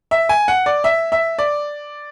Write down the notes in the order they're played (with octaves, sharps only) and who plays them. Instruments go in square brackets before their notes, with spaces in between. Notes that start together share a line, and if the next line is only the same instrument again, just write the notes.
[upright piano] E5
G#5
F#5
D5
E5
E5
D5